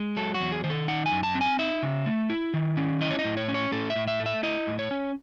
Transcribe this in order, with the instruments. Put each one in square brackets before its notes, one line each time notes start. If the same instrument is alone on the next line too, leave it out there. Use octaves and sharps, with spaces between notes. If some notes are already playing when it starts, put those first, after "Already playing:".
Already playing: [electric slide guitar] G#3
F#3 A4
F#4
E2
G#4
D#3 C5
A4
D#4 F#5
G#5
F#2
A5
C4
G#5
D#4 E5
C#3
A3
E4
D#3
C#4
E4 D#5
C#5
D#5
A2
C#5
C#4
C#5
A2 A4
E5
A2
E5
A3
E5
E4 D#5
A2
C#5
C#4